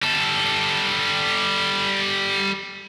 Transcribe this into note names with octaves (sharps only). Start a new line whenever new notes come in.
G3 A4